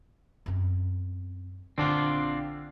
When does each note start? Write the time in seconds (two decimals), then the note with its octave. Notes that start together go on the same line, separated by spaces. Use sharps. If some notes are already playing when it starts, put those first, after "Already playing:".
0.46 F#2 C4
1.78 A#1 D3 C4 D4 F4